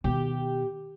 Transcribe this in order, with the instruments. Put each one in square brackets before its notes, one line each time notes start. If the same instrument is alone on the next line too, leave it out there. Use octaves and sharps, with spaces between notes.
[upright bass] B2 D#3 [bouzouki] G4